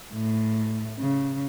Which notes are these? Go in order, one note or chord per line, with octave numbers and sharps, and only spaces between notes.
A2
C#3